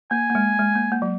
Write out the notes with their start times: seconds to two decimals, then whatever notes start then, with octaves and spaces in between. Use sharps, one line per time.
0.11 A#3 G#5
0.30 A#3
0.35 G#3
0.59 G#3
0.76 A#3
0.92 A#3
1.02 F#3